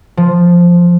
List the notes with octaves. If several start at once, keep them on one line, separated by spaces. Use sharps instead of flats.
F3